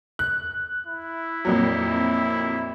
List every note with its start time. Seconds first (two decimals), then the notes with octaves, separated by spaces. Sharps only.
0.19 F#6
0.86 E4
1.45 F2 A#2 F#3